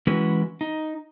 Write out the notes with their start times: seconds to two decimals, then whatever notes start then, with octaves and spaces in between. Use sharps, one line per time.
0.07 E3 G#3 C#4 E4 F#4 B4
0.61 D#4